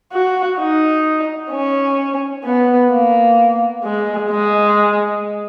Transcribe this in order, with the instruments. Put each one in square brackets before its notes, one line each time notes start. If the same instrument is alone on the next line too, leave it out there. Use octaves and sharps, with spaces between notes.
[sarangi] F#4
D#4
C#4
B3
A#3
G#3
G#3